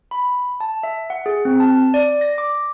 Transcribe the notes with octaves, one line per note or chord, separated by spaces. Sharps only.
B5
A5
E5
F#5
G#4
C4
A5
D5
A#6
D6